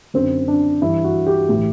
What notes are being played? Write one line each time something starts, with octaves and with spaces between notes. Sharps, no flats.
F#2 D3 C4
D4
G2 E3 E4
F#4
G4
A2 E3 G4